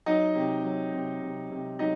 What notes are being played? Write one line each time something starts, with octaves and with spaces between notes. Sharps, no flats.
F#3 D#4 D#5
C3
F#3
C3
C3
C3
F#3 D#4 D#5